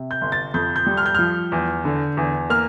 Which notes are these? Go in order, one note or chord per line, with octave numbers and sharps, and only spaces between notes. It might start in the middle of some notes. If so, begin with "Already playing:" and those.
Already playing: C3
G6
G1
A6
F2 G6
G6
G3
F6
G6
F3 F6
E2
D3
E2
A#3 F6